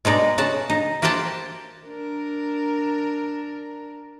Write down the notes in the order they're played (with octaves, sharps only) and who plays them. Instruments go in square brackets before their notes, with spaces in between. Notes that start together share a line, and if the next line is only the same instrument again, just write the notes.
[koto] B2 G#3 D#4 D5
C#3 F#4 A5
D#4
A#3 F#4 G4 C5 G5 A5
[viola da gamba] D4 A#4